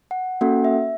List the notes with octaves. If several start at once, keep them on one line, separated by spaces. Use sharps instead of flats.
F#5
A#3 C#4 F#4 A4 F#5
E5